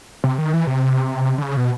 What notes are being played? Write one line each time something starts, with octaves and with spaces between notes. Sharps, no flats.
C3
D#3
E3
C3
D3
C#3
B2